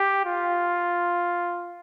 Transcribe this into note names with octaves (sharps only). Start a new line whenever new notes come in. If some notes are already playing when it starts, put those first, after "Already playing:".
Already playing: G4
F4